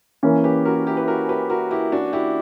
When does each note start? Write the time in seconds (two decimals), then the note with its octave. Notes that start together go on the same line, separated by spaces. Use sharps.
0.23 E3 A#3 C#4
0.44 G4 B4
0.65 F#4 A#4
0.76 F#4
0.87 E4 G4
0.97 B4
1.07 F#4 A#4
1.29 G4 B4
1.50 F#4 A#4
1.71 E4 G4
1.92 D4 F#4
2.13 E4 G4